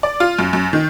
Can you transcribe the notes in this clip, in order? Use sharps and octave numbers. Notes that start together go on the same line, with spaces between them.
D5
F4
F#2
F#2
D#3